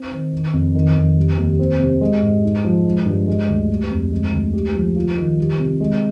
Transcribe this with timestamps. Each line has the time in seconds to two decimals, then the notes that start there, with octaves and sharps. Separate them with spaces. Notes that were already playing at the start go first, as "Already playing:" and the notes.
Already playing: C4
0.11 D#3
0.33 D#3
0.53 F2
0.75 D#3
0.96 F2
1.17 G3
1.37 D#2
1.59 C4
1.79 C3
2.01 G#3
2.22 G#2
2.44 D#4
2.65 F3
2.85 G#3
3.06 G2
3.28 G#3
3.49 D2
3.70 G3
3.91 F2
4.12 G#3
4.32 D2
4.53 G4
4.75 F3
4.96 F4
5.17 D#3
5.38 G3
5.59 C3
5.81 G#3